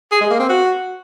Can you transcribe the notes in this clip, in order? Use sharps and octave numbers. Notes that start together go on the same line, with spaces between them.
G#4
G#3
A#3
C4
F#4